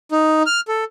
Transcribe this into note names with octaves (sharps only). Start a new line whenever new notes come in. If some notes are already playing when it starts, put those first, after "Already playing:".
D#4
F6
A4